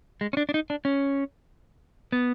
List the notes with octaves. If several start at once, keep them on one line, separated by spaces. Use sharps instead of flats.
G#3
C#4
D4
D4
D#4
D4
C#4
B3